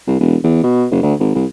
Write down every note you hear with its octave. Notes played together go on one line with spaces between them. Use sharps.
C2
E1
E2
B2
F#1
D2
G#1
C2